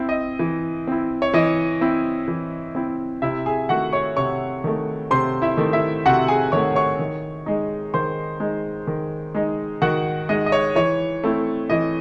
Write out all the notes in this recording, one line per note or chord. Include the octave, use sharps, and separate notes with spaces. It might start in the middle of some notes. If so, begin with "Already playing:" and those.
Already playing: C4 E4
D#5
E3
C4 E4
C#5
E3 D#5
C4 E4
E3
C4 E4
C3 E4 E5
G#4 G#5
D#3 A3 F#4 F#5
C#5 C#6
C3 C#5 C#6
D#3 A3
C3 C5 C6
E4 E5
D#3 A3
E4 E5
C3 F#4 F#5
G#4 G#5
D#3 A3 C#5 C#6
C#5 C#6
D#3
G#3 D#4
D#3 C5 C6
G#3 D#4
D#3
G#3 D#4
D#3 F#4 F#5
G#3 D#4 D#5
D#5
C#5
E3 C#5
A3 C4 E4
E3 D#5